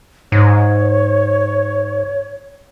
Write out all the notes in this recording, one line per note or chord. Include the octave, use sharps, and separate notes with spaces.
G#2 C#5